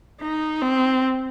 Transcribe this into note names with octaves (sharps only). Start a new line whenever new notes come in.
D#4
C4